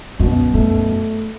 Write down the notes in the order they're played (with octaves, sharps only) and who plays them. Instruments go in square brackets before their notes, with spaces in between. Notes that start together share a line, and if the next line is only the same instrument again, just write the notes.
[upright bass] F#2 [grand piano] B2
[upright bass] F#2 [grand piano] A3